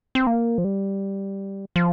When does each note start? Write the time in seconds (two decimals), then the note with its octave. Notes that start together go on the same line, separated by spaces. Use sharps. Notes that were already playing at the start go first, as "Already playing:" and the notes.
0.15 C4
0.27 A#3
0.58 F3
0.64 G3
1.76 F3